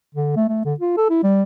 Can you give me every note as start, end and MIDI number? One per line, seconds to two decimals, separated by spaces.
0.15 0.32 50
0.36 0.45 57
0.48 0.64 57
0.65 0.74 50
0.80 0.93 65
0.97 1.08 69
1.10 1.19 64
1.23 1.43 55